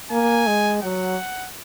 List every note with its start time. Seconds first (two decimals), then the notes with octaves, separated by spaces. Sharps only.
0.11 A#3 G#5
0.47 G#3
0.83 F#3 F#5